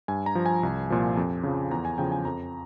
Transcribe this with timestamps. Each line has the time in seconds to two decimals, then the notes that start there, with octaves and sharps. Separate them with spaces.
0.08 G2 G#5
0.26 A#5
0.35 F3
0.46 G#5
0.63 C2
0.90 A#2 F3
1.17 F2
1.44 C#3 F3
1.71 E2 A#5
1.85 G#5
1.98 C#3 F3 G5
2.12 G#5
2.25 F2 A#5